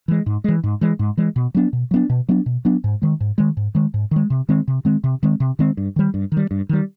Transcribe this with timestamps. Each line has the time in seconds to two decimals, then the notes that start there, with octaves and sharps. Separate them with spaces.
0.08 E3 G#3
0.26 G#2
0.44 E3 G#3
0.64 G#2
0.81 E3 G#3
0.99 G#2
1.17 E3 G#3
1.36 B2
1.55 F#3 B3 D4
1.73 B2
1.91 F#3 B3 D4
2.09 B2
2.29 F#3 B3 D4
2.46 B2
2.65 F#3 B3 D4
2.84 G#2
3.02 D#3 G#3
3.20 G#2
3.38 D#3 G#3
3.57 G#2
3.75 D#3 G#3
3.94 G#2
4.11 D#3 G#3
4.30 C3
4.49 D#3 G#3 C4
4.68 C3
4.85 D#3 G#3 C4
5.04 C3
5.23 D#3 G#3 C4
5.40 C3
5.59 D#3 G#3 C4
5.77 G2
5.96 D#3 G3
6.14 G2
6.32 D#3
6.37 G3
6.51 G2
6.69 D#3 G3